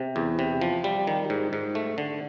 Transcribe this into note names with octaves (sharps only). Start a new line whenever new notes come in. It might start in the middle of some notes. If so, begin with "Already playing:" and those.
Already playing: C3
E2
C3
F3
G3
D#3
G#2
G#2
A3
D3